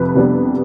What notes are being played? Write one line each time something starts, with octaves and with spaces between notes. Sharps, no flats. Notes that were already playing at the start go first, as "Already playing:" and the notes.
Already playing: F2 C3 B4
C3 G3 B3 D4